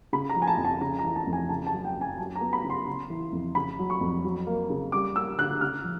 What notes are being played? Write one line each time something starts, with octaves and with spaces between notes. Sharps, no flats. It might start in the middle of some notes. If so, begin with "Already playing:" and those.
C#3 B5
A#5
F3
G#5
A5
F2
A5
C#3 A#5
A#5
E3
A5
F2
G#5
C#3 A5
A5
F#3
G5
F#2
G#5
F#3 A5
A#5
B3
B5
C#3
C6
C#3
E3
F2
C#3 B5
F#3
C#6
F2
F#3
A#3
C#3
G3 D6
A#3 E6
D3 F#6
C#3 F6
F3